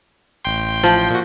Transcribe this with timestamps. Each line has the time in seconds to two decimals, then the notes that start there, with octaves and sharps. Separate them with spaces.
0.45 A1 G5 C6
0.84 F3
1.10 A#2 F#4